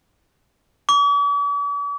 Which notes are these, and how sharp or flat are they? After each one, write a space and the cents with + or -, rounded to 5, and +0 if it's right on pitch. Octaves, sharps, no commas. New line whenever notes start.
D6 -45